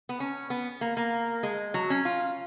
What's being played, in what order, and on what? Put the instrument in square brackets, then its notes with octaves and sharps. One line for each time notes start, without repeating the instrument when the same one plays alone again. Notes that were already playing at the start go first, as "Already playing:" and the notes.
[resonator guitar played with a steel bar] B3
C#4
B3
A#3
A#3
G#3
F#3
C#4
F4